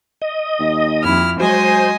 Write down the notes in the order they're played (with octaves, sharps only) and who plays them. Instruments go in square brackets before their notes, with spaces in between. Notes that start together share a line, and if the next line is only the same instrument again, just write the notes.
[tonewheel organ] D#5
[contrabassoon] D#2
[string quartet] F2 E4 F6
[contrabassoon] F#3 [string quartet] G#3 D#5 G#5 [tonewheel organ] C5